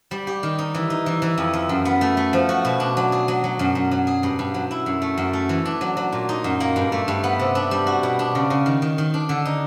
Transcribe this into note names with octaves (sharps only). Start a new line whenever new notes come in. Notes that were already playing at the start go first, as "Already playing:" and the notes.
G3
G4
D#3
D#4
E3
D#4
E3
E3
F2
F2
F#2
B3
A3
A3
F3
F#4
B2
D4
F#3
G#4
F#3
F#3
F#2
F#2
F#3
G#4
G2
G2
F#3
E4
F#2
A3
F#2
A3
E3
D4
F#3
F#3
A#2
D#4
F#2
A#3
G2
A3
G2
B3
C3
D4
G3
F#4
B2
D4
C#3
C#3
D#3
D#3
D#3
D4
D3
D#4